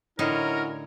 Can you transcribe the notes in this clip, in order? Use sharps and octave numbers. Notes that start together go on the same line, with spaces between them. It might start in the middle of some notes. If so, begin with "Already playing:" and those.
A2 D3 F#3 C#4 D#4 E4 A#4